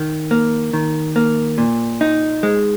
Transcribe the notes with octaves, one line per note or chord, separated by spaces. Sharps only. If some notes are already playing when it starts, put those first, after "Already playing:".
Already playing: D#3
A#3
D#3
A#3
A#2
D#4
G#3